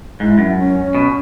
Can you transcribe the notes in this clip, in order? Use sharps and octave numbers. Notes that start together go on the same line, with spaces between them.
G#2 E4
F#2
C#4
B2